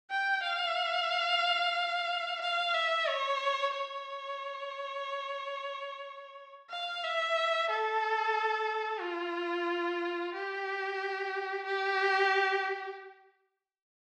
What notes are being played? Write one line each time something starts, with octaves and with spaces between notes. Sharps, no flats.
G5
F5
F5
E5
C#5
C#5
F5
E5
A4
F4
G4
G4